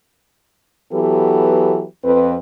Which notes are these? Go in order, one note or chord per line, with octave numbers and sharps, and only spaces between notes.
E3 F#3 B3 G4 A4 B4
F2 C4 B4